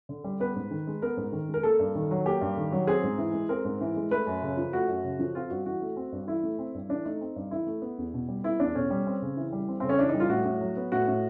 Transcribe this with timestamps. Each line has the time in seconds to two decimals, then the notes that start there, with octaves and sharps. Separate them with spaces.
0.09 D3
0.24 G3
0.40 B3 B4
0.55 G#2
0.71 D#3
0.87 G#3
1.02 B3 A#4
1.17 G#2
1.32 D#3
1.48 G#3
1.54 A#4
1.63 A#3 A4
1.79 G2
1.95 D#3
2.11 F#3
2.26 A#3 G4
2.41 G2
2.57 D#3
2.72 F#3
2.87 C4 G#4
3.03 G#2
3.18 E3
3.34 G#3
3.49 C4 A#4
3.65 G#2
3.81 E3
3.96 G#3
4.11 A3 B4
4.27 F#2
4.42 C#3
4.57 F3
4.73 A3 F#4
4.88 F#2
5.04 C#3
5.19 F3
5.35 C4 F4
5.50 G2 F#4
5.66 E3 F#4
5.82 A3
5.97 C4
6.12 G2
6.27 E3 E4
6.43 A3
6.59 C4
6.74 G2
6.89 E3 D4
7.05 A3 D#4
7.21 C4
7.36 G2
7.51 E3 E4
7.67 A3
7.82 B3
7.98 E2
8.14 B2
8.28 G3
8.44 B3 E4
8.60 E2 D4
8.75 B2 C#4
8.90 G3
9.07 C4
9.22 C#3
9.37 E3
9.52 G3
9.68 C4
9.80 C#3 C4
9.89 C#4
9.99 E3 D4
10.09 D#4
10.14 G3
10.20 F4
10.29 A2 F#4
10.45 A2
10.61 F#3
10.77 B3
10.92 A2 F#4
11.08 A2